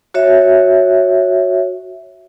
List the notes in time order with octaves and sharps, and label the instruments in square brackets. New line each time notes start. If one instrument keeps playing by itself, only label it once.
[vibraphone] F#4 C#5 E5